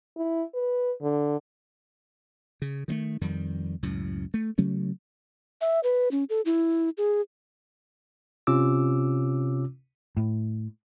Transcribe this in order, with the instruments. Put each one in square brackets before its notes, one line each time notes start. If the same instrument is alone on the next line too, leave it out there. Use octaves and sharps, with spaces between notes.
[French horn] E4
B4
D3
[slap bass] C#3
D#3 G3 A3
F2 D#3 G3
C#2 F#2 A2
A3
C#3 F#3 A3 C#4
[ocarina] E5
B4
C#4
A4
E4
G#4
[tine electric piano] C3 C#4 F4 D6 E6
[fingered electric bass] A2